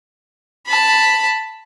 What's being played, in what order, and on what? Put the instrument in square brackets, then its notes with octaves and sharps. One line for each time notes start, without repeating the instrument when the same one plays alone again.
[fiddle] A5 B5